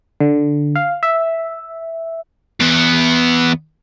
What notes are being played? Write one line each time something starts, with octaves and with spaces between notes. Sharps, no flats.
D3
F5
E5
E2 B3